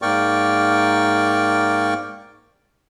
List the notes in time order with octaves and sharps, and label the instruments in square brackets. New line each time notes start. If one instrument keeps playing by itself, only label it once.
[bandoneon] G#2 A#3 A#4 D5 G5 C#6